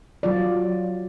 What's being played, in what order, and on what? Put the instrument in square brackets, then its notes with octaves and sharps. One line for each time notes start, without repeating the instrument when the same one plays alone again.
[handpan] F#3 F4 D5